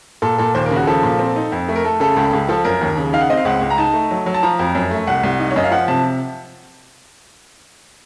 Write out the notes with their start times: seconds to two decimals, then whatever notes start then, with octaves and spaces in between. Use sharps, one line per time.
0.22 A#2 A4
0.38 A#2 A4
0.55 D#2 C5
0.66 A#4
0.70 C#3
0.76 F#4
0.87 F3 A4
1.03 A#2
1.19 C4
1.36 D#4
1.52 F2
1.69 A3
1.75 A#4
1.85 A3 A4
2.00 C#3 A4
2.16 C#2
2.33 C#2
2.49 F3 A4
2.64 F#2 A#4
2.81 D#2
2.97 C#3
3.13 D#4 F5
3.21 F#5
3.30 C4 D#5
3.37 F5
3.45 C#2 F#5
3.61 C#2
3.70 A#5
3.78 D#4 A5
3.94 A3
4.11 F#3
4.26 F#3
4.34 A5
4.43 F3 A#5
4.59 F2
4.75 F#2
4.91 A3
5.07 C2 F#5
5.23 C2
5.40 D#4
5.51 C#5
5.56 F#2 D#5
5.64 F5
5.71 F3 F#5
5.88 C3 A5